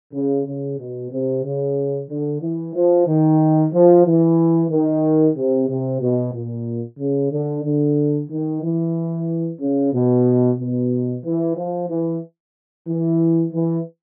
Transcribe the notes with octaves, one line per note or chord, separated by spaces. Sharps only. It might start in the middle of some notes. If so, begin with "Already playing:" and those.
C#3
C#3
B2
C3
C#3
D3
E3
F3
D#3
F3
E3
D#3
C3
C3
B2
A#2
C#3
D3
D3
D#3
E3
C#3
B2
B2
E3
F3
E3
E3
E3